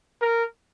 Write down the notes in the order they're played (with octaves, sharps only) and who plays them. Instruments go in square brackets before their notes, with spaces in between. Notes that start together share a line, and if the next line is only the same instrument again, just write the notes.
[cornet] A#4